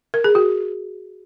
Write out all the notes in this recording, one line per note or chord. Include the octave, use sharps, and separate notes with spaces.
A#4
G#4
F#4